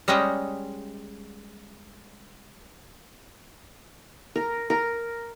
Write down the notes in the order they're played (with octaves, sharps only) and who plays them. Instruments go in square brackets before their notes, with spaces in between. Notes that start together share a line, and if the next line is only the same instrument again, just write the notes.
[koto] G3 G#3 C#4 D#5 G5
[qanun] A#4
A#4